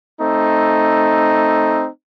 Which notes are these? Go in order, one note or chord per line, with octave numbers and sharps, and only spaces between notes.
A3 C4 D#4